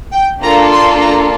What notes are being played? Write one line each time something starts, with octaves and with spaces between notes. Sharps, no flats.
G5
A#3 D4 F4 A4 A#5
C6
A#5